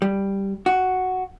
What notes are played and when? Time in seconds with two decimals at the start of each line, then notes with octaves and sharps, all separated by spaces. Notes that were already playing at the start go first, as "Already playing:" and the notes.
0.02 G3
0.66 F#4